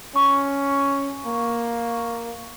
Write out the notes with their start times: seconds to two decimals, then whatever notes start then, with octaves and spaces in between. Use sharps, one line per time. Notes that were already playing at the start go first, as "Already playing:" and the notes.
0.16 C#4 C#6
1.27 A#3